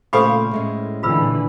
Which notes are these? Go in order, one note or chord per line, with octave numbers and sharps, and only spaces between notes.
A#2 C#3 A3 A4 C5 F5 B5 C#6
A2 G#3 C#4
A#2 D3 E3 F4 B5 E6